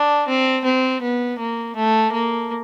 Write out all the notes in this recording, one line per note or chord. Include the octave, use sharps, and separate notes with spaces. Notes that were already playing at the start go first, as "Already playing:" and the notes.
Already playing: D4
C4
C4
B3
A#3
A3
A#3